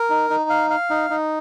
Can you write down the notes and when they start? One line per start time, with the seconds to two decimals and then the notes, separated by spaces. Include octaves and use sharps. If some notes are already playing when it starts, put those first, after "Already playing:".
Already playing: A#4
0.10 D#4
0.30 D#4
0.50 F5
0.70 F5
0.90 D#4
1.10 D#4